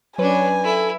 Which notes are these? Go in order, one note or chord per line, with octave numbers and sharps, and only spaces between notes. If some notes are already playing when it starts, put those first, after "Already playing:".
F#3 C#4 D4 B4 C#5 G#5
E4 A4